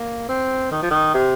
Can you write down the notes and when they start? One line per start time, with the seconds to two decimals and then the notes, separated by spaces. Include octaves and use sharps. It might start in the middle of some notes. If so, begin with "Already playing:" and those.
Already playing: A#3
0.28 C4
0.71 D#3
0.82 F3
0.90 D#3
1.14 C3